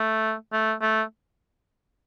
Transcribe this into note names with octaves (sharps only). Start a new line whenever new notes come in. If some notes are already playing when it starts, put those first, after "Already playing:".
Already playing: A3
A3
A3